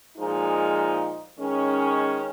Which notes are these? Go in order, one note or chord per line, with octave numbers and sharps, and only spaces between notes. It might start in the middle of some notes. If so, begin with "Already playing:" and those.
A#2 F3 G#3 D#4
D#3 G#3 C#4